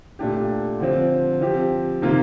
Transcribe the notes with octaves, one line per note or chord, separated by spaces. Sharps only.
A#2 A3 D4 G4
D3 F3 C4
F3 C4 G4
C3 D#3 A#3 F4